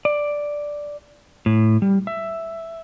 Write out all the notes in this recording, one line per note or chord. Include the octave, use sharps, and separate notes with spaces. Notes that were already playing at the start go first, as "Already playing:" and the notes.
D5
A2
G3
E5